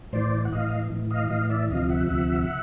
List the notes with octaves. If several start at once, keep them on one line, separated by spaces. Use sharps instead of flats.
A2 E3 C5 D5
F#5
A2 E3 D#5 F5
A2 E3
D#5 F5
A2 E3 D#5 F5
D5 E5
D2 C3 F3 D#5 F5
E5 F#5
D2 C3 F3 E5 F#5